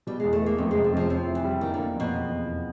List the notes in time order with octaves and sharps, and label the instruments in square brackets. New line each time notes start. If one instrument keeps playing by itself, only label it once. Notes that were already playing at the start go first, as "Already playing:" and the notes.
[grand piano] B2 [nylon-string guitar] G3
[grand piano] E2 [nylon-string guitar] G#3
[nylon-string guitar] A3
[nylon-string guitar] A#3 [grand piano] B3
[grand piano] F2 [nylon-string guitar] A3
[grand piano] C3 [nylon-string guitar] G#3
[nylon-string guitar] A3
[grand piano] F2 [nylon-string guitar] F3
[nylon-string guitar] F3 [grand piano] C4
[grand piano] E4
[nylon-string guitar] E3
[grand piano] G3
[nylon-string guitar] D#3 [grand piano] A#3
[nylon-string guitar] D3 [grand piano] A#3
[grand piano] F2 [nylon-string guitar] B2
[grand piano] E2
E2